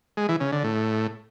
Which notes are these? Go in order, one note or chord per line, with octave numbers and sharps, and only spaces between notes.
G#3
E3
C#3
D3
A2